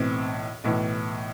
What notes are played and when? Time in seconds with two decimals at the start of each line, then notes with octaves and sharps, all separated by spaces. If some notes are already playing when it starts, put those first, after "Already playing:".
Already playing: B1 A2 E3 C4
0.64 B1 A2 E3